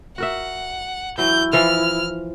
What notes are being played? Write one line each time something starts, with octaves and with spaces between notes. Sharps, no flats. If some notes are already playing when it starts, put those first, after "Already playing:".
F#4 A#4 E5 F#5
E3 F#3 E4 G6
E3 F3 F6